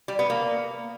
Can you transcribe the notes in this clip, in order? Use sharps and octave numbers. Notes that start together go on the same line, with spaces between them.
G3
B3
A#3